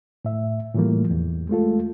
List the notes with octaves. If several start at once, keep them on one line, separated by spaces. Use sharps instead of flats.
A2 E5
A2 E3 F3 G3 A3 A#3
E2
G#3 A3 F4 A4